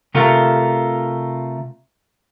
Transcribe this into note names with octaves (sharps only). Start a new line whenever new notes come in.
C3 A3 F4 A#4